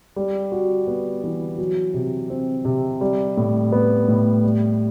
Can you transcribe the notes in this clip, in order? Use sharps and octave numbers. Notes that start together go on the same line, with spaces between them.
G3
F#4
B3
E3
F#3
C3
C4
C3
G3
A2
B3
A2
G3